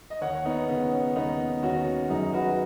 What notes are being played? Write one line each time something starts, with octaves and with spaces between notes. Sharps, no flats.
D#5
D#2 C#5 F#5
B3 D#4
C#3 B3
C#4
D#2 B3 D#4
D#2 C#4 F#4
F#2 D#4 G#4
F#4 B4